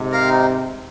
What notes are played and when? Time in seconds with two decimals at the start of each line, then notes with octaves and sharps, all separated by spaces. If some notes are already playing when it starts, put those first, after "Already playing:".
Already playing: G#2 C3
0.12 A#4 F5
0.29 D#4